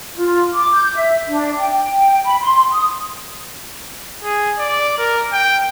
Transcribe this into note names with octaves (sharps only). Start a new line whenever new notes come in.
F4
D6
G6
E5
D4
G5
G5
B5
C6
D#6
G#4
D5
A#4
G5